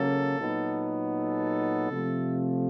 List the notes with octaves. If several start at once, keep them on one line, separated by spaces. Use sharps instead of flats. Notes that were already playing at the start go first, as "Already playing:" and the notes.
Already playing: C#3 F#3 A#3 C#4 A4
A#2 F#3 B3 D#4
A4
C3 F3 A3